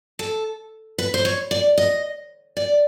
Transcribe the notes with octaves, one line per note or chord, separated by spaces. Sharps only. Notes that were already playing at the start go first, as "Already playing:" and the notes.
A4
B4
C5
C#5
D5
D#5
D5